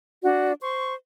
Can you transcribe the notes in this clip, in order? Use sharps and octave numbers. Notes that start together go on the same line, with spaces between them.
D4 F#4 D5
C5 C6 C#6